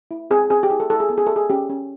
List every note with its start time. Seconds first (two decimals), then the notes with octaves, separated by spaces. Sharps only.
0.11 E4
0.31 C4 G#4
0.50 C4 G#4
0.63 G4
0.70 E4 G#4
0.80 A4
0.90 E4 A4
1.00 G#4
1.09 B3 A4
1.18 G#4
1.27 G4 A4
1.36 G#4
1.50 C#4 G4
1.69 C#4